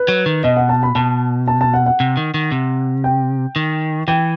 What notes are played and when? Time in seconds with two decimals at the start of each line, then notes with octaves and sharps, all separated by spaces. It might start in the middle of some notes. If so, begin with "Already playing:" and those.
Already playing: B4
0.08 F#3
0.26 D#3
0.43 B2 D#5
0.57 F#5
0.69 A5
0.83 B5
0.95 B2 A5
1.48 A5
1.61 A5
1.74 F#5
1.86 F#5
2.00 C3
2.17 D#3
2.34 D#3
2.52 C3
3.04 G5
3.56 D#3
4.08 E3 G5